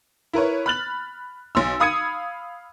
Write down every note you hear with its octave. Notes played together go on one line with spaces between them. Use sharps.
E4 A#4 B4 C#5
B5 F6 F#6 A6 F#7
B1 C6 E6
F5 B5 D#6 G#6 C#7 D#7